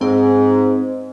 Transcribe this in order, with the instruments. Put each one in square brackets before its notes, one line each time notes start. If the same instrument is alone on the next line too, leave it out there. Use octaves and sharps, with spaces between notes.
[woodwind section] G#2 [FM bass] C4